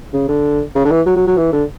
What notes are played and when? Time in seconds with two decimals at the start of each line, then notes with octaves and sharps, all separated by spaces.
0.13 C#3
0.28 D3
0.75 C#3
0.85 D3
0.90 E3
1.06 F#3
1.16 F#3
1.27 F#3
1.37 E3
1.52 D3